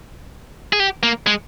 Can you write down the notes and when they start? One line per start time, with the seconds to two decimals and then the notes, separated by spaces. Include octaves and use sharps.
0.73 G#4
0.80 G4
1.03 A#3
1.27 G#3